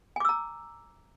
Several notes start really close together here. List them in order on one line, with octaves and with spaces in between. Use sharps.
G#5 D6 E6 A#5